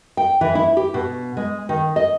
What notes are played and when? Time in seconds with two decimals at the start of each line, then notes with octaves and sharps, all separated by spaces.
0.17 G5
0.41 E3
0.55 E4
0.77 G4
0.94 B2
1.37 G#3
1.69 D#3
1.96 D#5